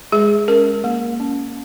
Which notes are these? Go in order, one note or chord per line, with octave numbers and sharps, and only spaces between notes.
G#3 G#4
C#4 A#4
A#3
C#4